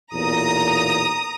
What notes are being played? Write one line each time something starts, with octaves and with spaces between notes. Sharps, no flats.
B1 E2 A#2 A#5 D#6